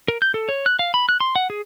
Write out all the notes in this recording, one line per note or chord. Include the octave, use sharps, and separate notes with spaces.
A#4
G6
A4
C#5
F#6
F5
B5
F#6
C6
F#5
G#4